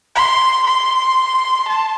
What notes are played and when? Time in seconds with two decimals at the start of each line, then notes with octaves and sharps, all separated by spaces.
0.15 C6
0.67 C6
1.68 A5